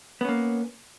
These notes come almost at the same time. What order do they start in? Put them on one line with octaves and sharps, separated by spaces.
B3 C#4 A#3